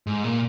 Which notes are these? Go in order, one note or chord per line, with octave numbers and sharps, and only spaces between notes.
G#2
A#2